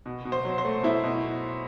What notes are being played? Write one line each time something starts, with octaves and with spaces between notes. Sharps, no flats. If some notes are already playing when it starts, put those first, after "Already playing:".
B2
B2
C5
F#3
C5
A3
B2 E4
B2